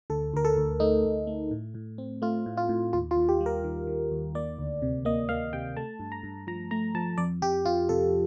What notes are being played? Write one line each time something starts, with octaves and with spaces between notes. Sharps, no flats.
D2 A4
D2 A#4
A4
D2
A3 D#4
D2
A3
A2
A2
C4
A3 F4
A2
F4
A2
D#2 F4
F4
D#2
G4
G3
A#4
D#3
D#3
D#2
A#3 D5
D2
C3
A#3 D#5
A#3 F5
C3 G5
A3 A5
G2
A#5
G2
F3 A#5
A3 A#5
F3 A5
F2 D5
F2 G4
F2 F4
C3 A4